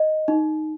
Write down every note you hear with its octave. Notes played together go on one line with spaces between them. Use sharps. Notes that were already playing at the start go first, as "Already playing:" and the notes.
Already playing: D#5
D#4